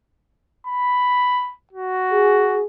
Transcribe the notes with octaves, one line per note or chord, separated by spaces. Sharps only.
B5
F#4
G#4